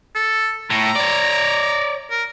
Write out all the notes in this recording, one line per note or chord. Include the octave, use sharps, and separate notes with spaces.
A4
A2 A#5
C#5 D5
A#4